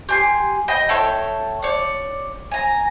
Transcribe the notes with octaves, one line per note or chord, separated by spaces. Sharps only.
G4 G#5 C6
D#5 G5 B5
E4 A4 C#5 G5
C#5 D5
G#5 A#5